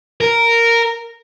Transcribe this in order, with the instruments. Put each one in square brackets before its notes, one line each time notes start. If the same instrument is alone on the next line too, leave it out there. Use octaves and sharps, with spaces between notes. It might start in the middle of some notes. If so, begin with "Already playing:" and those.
[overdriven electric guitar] A#4